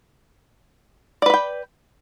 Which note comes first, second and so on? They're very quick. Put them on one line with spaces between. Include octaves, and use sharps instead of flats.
D5 B4 B5 G5